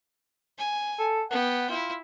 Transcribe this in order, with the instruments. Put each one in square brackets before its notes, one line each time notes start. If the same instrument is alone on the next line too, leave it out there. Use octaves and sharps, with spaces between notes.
[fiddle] G#5
[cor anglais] A4
[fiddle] B3 G5 [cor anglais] F#5
[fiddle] E4 [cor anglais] F4